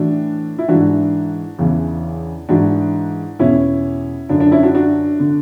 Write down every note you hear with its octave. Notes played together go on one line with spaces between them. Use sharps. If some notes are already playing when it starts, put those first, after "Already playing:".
Already playing: A2 E3 D4 F#4
E4
G#2 E3 D4 F#4
E2 C#3 E3
G#2 E3 D4 F#4
E2 B2 C#4 E4
F#2 D3 D4
D4
C#4 E4
D4 F#4
D4 F#4
D3